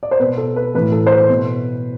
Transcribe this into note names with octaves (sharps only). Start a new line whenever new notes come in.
D5
C5
B2 B4
A4
B4
A2 E3 B4
A4
C5
B4
B2